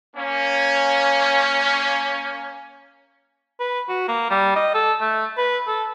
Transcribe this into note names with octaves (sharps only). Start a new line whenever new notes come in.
A#3 C#4
B4
F#4
A#3
G3
D#5
A4
A3
B4
A4